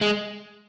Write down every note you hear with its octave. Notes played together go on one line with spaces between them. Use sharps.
G#3